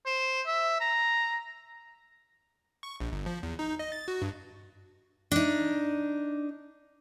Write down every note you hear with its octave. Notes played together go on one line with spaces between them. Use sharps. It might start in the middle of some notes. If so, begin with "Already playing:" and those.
C5
E5
A#5
C#6
A#1
G1
F3
E2
D#4
D#5
A6
F#4
G2
D4 D#4